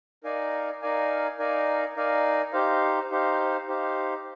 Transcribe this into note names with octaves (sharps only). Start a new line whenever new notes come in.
D#4 A#4 D5 F5 G#5
D#4 A#4 D5 F5 G#5
D#4 A#4 D5 F5 G#5
D#4 A#4 D5 F5 G#5
D#4 G4 C5 F5
D#4 G4 C5 F5
D#4 G4 C5 F5